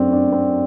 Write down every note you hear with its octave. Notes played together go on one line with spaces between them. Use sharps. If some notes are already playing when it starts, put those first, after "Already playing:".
Already playing: F#2 F#3 A3 C4 D4 F#4
D4
C4